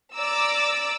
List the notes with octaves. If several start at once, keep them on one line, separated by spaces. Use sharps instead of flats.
D5 A#5 D6 E6